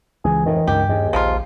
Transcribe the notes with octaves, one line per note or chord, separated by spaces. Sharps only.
C#2 E3 G#4
F2 A2 D#3
C#2 G2 G4
D#2 G#3
A#1 F3 A#3 F4